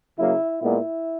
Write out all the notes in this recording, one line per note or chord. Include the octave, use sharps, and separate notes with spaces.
C#3 F#3 A#3 E4
A#2 G#3 B3 E4